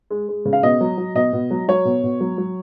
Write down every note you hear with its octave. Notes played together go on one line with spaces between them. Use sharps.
G#3
G#3
C#3
F5
B2 D#5
F#3
F#3
B2 D#5
B2
F#3
F#3 C#5
B2
B2
F#3
F#3